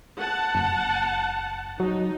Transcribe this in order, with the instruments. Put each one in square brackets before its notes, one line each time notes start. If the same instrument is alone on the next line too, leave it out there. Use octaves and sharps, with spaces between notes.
[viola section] F#5 A5
[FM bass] F#1
[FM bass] F#3 [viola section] D#4